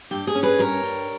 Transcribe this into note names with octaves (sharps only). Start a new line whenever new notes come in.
G2 G4
G#4
C#4
G#4 B4
G2 A#4 C#5
G3